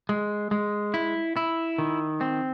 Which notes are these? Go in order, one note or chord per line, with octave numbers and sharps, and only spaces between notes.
G#3
G#3
E4
E4
D#3
C4